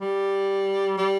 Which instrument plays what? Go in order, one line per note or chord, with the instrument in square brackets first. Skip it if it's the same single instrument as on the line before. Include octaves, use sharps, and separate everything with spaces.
[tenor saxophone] G3
G3